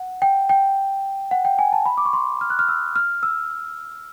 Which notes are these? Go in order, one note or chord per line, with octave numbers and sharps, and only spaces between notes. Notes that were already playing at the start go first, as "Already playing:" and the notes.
Already playing: F#5
G5
G5
F#5
G5
G#5
A5
B5
D6
C#6
C6
F6
F#6
F6
E6
F6
E6